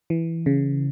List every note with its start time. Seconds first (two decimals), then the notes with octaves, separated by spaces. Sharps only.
0.10 E3
0.46 C#3